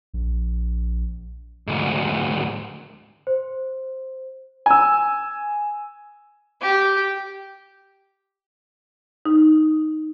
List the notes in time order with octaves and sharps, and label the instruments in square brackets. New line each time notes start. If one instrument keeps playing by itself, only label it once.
[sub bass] A#1
[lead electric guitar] D2 G#2
[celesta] C5
[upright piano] G#5 E6
[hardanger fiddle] G4
[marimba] D#4